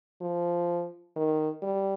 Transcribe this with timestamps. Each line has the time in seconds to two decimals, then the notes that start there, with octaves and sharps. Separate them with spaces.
0.21 F3
1.16 D#3
1.62 G3